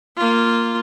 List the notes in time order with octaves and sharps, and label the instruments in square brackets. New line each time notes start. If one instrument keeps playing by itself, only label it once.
[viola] A#3 F4